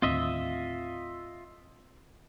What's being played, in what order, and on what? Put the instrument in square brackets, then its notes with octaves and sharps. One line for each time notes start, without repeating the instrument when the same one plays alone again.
[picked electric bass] D#2 A2 D3 [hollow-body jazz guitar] C4 C6 [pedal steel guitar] F4 D#5 E5